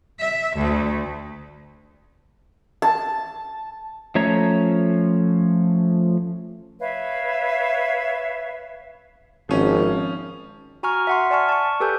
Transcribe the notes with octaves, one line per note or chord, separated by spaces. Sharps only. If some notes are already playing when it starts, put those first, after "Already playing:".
E5
D2
A5
F3 A3 C#4 C#5 A#5
B4 C#5 E5 F5
G#1 F3 C#4
F#4 G#5 A#5 C#6 F6
E5 F#5 C6
D5 G#5 A5 C#6 F6
A5 C#6
G4 A4 B4 G#5 G6